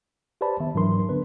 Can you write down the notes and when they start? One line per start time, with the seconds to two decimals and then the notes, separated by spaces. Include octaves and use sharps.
0.41 G4 B4 C5 D5 A5 B5
0.60 D#3 B3 E5
0.75 G#2 E3 F#3 D4 A#4 C6
1.09 D3 B3 D4 B4